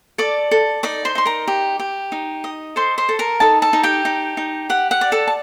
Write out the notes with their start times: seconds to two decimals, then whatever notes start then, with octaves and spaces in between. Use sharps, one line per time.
0.18 A4 D5 D6
0.51 A4
0.83 D#4 D5 D6
1.05 C5 C6
1.15 D#4 C6
1.26 A#4 A#5
1.48 G4
1.79 G4
2.12 D#4
2.44 D#5
2.76 A4 C5 C6
2.98 C5 C6
3.09 A4
3.19 A#4 A#5
3.40 D#4 A4 A5
3.62 A4 A5
3.73 D#4
3.83 G4 G5
4.05 D#4
4.37 D#4
4.69 G4 F#5
4.91 F#5
5.01 D5
5.12 A4 A5
5.27 A5